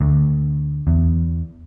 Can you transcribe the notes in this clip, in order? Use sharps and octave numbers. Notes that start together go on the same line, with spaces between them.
D2
E2